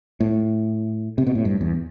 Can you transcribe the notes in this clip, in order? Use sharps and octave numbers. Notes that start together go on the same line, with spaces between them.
A2
C3
B2
A2
G2
E2